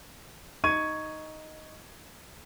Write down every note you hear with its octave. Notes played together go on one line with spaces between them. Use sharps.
D#4 C#6 G#6 D#7